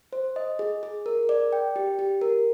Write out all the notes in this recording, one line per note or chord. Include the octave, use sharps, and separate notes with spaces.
C5
D#5
G#4
G#4
A#4
D5
G5
G4
G4
A#4